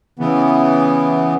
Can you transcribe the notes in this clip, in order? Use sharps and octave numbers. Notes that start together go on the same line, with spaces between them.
C#3 E3 B3